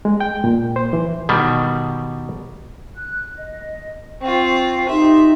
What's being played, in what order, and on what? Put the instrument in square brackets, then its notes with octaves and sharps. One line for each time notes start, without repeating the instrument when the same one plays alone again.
[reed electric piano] G#3
G5
A#2
C5
E3
[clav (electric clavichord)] B2 D#3 G3
[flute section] F#6
D#5
[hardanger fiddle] C4 F4 [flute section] C5 G5 C#6
[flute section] D#4 G4 C6 [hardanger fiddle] E5